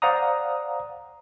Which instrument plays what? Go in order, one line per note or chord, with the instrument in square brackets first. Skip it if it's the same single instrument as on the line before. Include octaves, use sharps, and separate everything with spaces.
[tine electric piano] C5 D5 F5 F#5 A#5 D#6